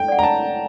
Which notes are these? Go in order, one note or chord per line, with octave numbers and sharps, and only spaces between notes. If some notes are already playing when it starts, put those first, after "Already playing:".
Already playing: A4 G5
D5 F#5
A#5
A5